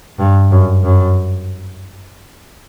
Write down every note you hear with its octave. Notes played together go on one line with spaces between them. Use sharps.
G2
F#2
F#2